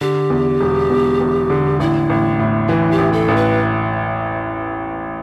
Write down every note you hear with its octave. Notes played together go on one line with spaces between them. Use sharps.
D3 G4
E2
E1
E2
E2
D3
A1 E4
A1
A2
E3 E4
G4
A1
A4
A1
B4